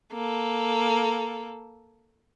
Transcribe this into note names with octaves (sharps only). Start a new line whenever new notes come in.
A#3 A4